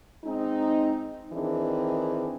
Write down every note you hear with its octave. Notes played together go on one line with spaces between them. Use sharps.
G#3 C4 D#4
D#3 E3 C4 D4 G#4